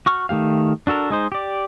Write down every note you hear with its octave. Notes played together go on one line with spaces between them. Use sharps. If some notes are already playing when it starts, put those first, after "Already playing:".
F#4 C#6 F6
D#3 A3 G4 F5
D4 F#4 A4 A#4
G#3 D#4 C5
G4 D5